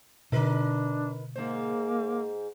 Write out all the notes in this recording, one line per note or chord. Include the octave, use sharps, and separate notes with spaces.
B2 D3 D4 D#4 A#4 B4
G#2 A#3 C5